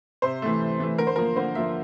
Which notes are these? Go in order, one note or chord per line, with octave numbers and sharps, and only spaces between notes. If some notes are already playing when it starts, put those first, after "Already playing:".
C3 C5
E3 A3
C3
E3 A3
D3 A#4
C5
F3 A#3 A#4
D3 C5
F3 A#3 E5